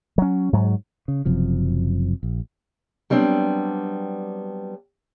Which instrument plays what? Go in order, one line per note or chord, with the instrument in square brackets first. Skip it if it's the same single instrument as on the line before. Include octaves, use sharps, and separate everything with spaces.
[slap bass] F#3 C#4
G#2 F#3
[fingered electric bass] C#3
F#1 F#2 C3 F3
A#1
[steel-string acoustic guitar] F#3 G3 B3 C4 D4